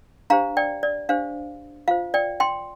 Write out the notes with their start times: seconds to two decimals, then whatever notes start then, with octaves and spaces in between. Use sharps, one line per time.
0.30 D4 G4 C5 F5 A#5
0.57 D5 G5
0.83 D5
1.09 D4 G4 C5 F5
1.88 F4 C5 F5
2.14 D5 G5
2.40 G5 C6